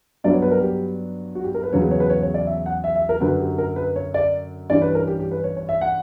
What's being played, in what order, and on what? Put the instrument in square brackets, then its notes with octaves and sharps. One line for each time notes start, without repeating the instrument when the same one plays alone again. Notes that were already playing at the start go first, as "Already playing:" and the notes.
[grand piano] G2 F#3 B3 D4 D5
C#5
B4
A#4
G4
F#4
G4
A#4
B4
E2 C#3 F#3 C#5
B4
C#5
B4
C#5
C#5
D5
E5
F#5
E5
E5
A#4
F#2 D3 F#3 B4
G4
A#4
B4
C#5
D5
G2 E3 G3 C#4 D5
B4
A#4
G4
G4
B4
C#5
C#5
E5
F#5